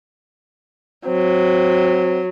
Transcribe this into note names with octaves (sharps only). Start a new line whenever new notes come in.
F#3 C4